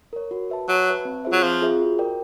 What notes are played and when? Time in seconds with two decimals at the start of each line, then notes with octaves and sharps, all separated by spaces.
0.13 A#4 C#5
0.31 F#4
0.50 B4 E5 A5
0.68 F#3 F#4
0.87 B4 E5 A5
1.05 C4
1.25 F4 G#4 C5 E5
1.32 F#3
1.43 F3 C4
1.61 F4 G#4 C5 E5
1.80 F#4
1.99 A#4 D5 G5